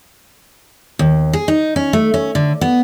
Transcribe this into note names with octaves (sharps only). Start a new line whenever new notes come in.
D#2
G#4
D#4
C#4
A3
C#4
D3
B3